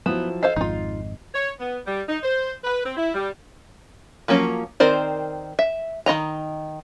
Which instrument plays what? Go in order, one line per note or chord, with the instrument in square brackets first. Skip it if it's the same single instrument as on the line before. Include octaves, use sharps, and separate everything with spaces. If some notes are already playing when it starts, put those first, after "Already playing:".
[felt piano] F3 F#3 E4 [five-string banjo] B3 [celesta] E7
[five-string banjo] A4 C5 F5 [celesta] D#5 [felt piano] C7
[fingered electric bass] G#1 F2 G#2 [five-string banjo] D#4 F4
[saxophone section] C#5
B3
G3
D#4
C5
B4
C4
E4
G3
[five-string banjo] F3 F#3 A#3 C#4
D#3 C4 A#4 C5 D5
E5
D#3 F4 D#5 A#5